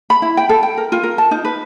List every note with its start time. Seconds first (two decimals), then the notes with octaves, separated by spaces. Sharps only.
0.10 B5
0.22 E4
0.37 G5
0.49 A4
0.63 G5
0.78 A#4
0.92 F4
1.03 A#4
1.18 A5
1.31 D#4
1.45 B4